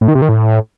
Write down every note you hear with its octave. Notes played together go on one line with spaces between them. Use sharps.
A2
D#3
C3
D#3
A2